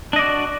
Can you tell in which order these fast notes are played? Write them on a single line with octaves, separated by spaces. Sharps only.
D4 D#5 D5 F#4